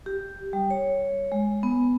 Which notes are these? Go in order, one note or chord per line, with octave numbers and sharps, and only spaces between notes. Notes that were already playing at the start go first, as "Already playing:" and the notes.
G4
G3
C#5
G#3
B3